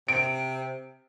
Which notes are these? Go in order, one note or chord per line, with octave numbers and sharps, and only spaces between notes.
C3 D7